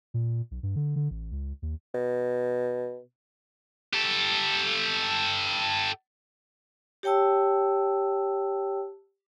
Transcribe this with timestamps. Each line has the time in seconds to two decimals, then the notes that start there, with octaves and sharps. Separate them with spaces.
0.14 A#2
0.51 B1
0.63 G2
0.76 D3
0.96 D3
1.11 A1
1.32 C#2
1.62 D#2
1.94 B2
3.93 G4 A4
7.03 G4 C#5 G5 A5 E6